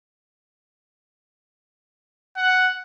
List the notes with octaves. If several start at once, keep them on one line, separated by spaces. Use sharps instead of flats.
F#5